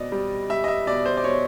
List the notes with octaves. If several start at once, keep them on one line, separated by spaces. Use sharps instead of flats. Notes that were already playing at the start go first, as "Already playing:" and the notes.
Already playing: B2 C4 D5 D#5
G3
G3 E5
D#5
E5
B2 D5
C5
D5
B2 C#5